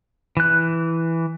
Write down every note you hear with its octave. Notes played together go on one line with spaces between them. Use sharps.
E3 F#6